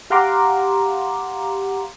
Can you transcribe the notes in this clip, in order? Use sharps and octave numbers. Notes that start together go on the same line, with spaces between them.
G4 F5 F#5 A#5 C6 D6